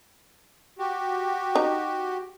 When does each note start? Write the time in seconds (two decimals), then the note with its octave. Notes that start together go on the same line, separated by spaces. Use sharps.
0.79 F#4 G4
1.55 D#4